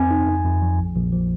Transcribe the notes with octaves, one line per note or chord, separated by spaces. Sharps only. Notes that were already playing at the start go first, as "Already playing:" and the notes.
Already playing: F2 C4 G#5
D#4
F2
F2
F3
A#1
A#1
F3